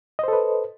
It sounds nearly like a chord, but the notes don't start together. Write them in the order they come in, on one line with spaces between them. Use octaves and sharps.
D#5 C5 A4 B4